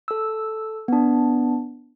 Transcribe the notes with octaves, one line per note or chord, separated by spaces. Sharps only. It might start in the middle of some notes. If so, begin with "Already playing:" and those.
A4 E6
B3 D4